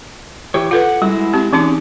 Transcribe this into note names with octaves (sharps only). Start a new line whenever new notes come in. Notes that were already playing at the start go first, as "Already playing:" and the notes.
E3 G4 C#5
F4 A4 B4 F#5
G3 G#3 E4 F#4
C4 G4
E3 C4 C#4 D#4 G#4 D6